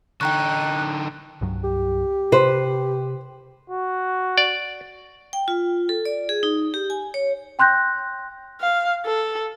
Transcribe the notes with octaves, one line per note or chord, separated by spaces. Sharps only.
D3 D#4 G5 A#5 C#6 F#6
C2 G2 F#3
G4
C3 B4 C5
F#4
D5
G5
F4
A4
D5
G#4
D#4
G4
G#5
C#5
G5 C6 F#6 G6 A#6
F5
A4